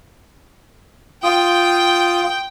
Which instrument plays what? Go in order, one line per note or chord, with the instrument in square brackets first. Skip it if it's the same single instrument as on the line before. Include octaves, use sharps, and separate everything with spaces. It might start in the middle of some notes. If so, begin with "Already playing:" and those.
[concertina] F4 D#6 [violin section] G5